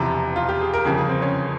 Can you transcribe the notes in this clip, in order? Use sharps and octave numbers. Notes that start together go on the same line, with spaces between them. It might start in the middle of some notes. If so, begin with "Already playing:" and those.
Already playing: E1 E2 C3 F3
F4
G4
G#4
A#4
G1 F2 C#3 G#4
G#4
C4
C#4